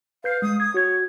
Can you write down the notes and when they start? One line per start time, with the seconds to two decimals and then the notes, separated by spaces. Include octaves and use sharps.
0.24 B4 F5 G6 C7
0.42 G#3 D#6
0.60 D#6 G#6
0.74 F#4 C#5 G#6